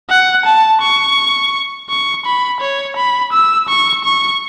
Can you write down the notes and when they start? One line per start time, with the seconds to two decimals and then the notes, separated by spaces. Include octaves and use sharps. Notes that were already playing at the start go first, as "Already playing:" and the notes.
0.10 F#5
0.46 A5
0.82 C#6
1.90 C#6
2.26 B5
2.61 C#5
2.97 B5
3.33 E6
3.69 C#6
4.04 C#6